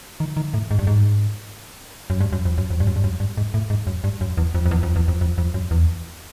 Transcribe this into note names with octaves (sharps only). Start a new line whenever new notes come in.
D#3
D#3
A2
G#2
G2
G#2
F#2
G2
F#2
F2
F#2
F2
G2
F#2
G2
F#2
G2
G#2
A2
G#2
F#2
G2
F#2
E2
F2
F2
E2
F2
E2
F2
F2
F2
F#2
E2